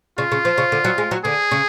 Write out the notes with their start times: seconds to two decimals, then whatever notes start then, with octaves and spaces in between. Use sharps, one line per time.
0.18 C#3 F4
0.32 C#3
0.45 F3
0.58 C#3
0.72 D3
0.84 F#3
0.98 G#3
1.11 F#3
1.24 D3 G#4
1.51 C#3